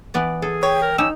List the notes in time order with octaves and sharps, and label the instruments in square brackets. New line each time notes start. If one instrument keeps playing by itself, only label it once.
[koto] E3 B3 D5
[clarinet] G#4 [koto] A4
[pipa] C#5 [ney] G5
[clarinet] A#4
[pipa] G3 C#4 [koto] D#4 [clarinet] E6